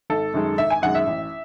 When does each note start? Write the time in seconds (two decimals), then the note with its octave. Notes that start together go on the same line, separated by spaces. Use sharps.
0.10 G#1 A4
0.34 F#2 D#3 G#3
0.58 G#1 E5
0.70 G#5
0.82 F#2 D#3 G#3 F#5
0.95 E5
1.07 A1